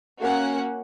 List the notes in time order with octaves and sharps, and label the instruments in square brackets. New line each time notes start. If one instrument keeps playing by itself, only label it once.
[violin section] A#3 C#4 F#4 F#5